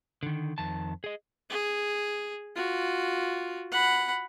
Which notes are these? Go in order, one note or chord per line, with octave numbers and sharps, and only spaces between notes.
D3 D#3
F2 D#3 A5
G#4 D#5
G#4
F4 F#4
F#5 B5